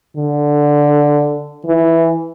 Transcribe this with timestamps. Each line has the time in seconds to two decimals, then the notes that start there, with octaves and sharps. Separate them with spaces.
0.16 D3
1.65 E3